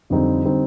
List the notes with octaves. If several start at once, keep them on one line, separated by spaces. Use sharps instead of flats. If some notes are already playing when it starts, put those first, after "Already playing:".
F2 D3 G3 C4 D#4
D3 G3 C4 D#4